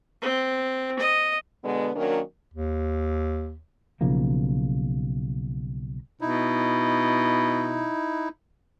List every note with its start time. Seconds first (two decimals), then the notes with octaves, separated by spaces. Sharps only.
0.22 C4
0.99 D#5
1.64 B2 D3 G#3 B3
1.96 D#3 F#3 A#3 C#4 D4 A#4
2.54 D#2
4.01 B1 C#3 F3 A#3
6.21 B2 D#4 E4